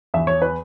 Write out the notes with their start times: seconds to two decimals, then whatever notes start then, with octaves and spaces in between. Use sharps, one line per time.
0.14 E2 E5
0.27 C#5
0.42 B4